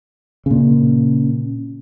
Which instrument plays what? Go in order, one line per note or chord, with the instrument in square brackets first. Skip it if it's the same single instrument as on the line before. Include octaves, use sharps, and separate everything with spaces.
[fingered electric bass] A#2 C#3